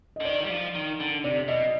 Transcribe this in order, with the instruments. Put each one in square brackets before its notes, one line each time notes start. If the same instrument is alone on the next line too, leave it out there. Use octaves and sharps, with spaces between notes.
[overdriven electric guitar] D3 [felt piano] D#5
[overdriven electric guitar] D#3 [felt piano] D5
[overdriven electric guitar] G3
F3
D#3
D3
[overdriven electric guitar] C3 [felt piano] D5
[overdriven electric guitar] B2 [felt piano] D#5